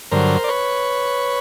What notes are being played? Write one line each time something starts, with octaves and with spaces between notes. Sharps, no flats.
G2 D3 F#3 A#4 C5
D5
B4 C#5